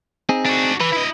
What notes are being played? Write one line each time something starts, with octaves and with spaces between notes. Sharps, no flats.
C4 D#4 G#4
D4 F#4
E3 B4
E4 D#5